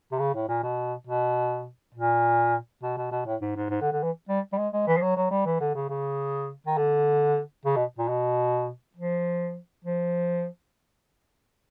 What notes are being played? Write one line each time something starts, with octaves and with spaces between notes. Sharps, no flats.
C3
C#3
A2
A#2
B2
B2
A#2
B2
B2
B2
A2
G#2
G#2
G#2
D3
D3
E3
G3
G3
G#3
G#3
E3
F3
F#3
F#3
G3
E3
D3
C#3
C#3
D#3
D3
C#3
B2
A#2
B2
F3
F3